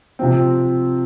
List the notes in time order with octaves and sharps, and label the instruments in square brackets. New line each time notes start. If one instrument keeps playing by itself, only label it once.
[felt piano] C3 F3 C4